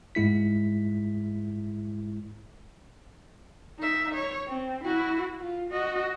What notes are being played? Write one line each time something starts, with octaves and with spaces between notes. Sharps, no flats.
G#2 G#3 E4 B6
D#4 E5
C#5
C4
E4 F#4
F4
F#4 D#5